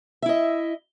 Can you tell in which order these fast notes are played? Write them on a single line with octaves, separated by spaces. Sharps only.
E5 E4 D#5